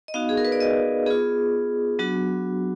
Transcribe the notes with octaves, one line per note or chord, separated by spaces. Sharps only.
D#5
B3 D#4 F#4 F5
G#4
A#4
B4
D5
D#5
B3 F4 G#4
F#3 B3 D4 F#4